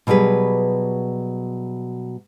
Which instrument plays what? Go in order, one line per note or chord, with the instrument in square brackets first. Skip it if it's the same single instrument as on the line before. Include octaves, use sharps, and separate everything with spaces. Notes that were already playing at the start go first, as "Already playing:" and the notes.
[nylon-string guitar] B2 F#3 G3 G#4 B4